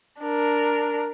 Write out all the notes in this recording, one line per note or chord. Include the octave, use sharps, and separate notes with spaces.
D4 A#4